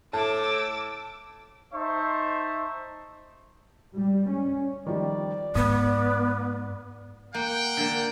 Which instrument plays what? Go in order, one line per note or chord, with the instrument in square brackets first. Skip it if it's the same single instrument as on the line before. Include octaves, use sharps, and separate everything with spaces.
[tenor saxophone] A2 [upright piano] A5 [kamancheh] D6 E6
[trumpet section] D#4 C5 E5 A5 C#6
[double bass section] G3
C#4
[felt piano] D#3 F3 G3 [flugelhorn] D5
[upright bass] G#2 [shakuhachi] B3 [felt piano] D#6
[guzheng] A#3 [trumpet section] F#5 G5
[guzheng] D3 A#3